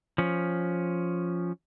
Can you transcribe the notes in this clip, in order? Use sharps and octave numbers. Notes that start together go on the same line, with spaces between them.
F3 C#4